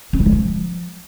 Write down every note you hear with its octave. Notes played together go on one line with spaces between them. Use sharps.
C#4
D#4
G#3
F3